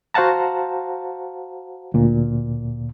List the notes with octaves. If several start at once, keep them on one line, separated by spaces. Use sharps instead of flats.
F#4 C5 F5 F#5 A5 A#5
D2 A#2